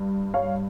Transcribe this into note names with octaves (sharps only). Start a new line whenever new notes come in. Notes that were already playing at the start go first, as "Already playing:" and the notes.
Already playing: G2
C#5 F5